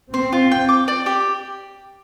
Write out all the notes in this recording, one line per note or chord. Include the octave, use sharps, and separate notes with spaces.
C4 C5
F4
G5
D6
D5
G4